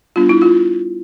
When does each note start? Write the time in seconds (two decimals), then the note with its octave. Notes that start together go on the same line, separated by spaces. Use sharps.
0.16 G3 B3 D4 F4
0.29 E4
0.42 F4